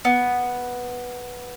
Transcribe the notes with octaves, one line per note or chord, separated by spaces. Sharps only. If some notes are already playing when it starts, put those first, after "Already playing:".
B3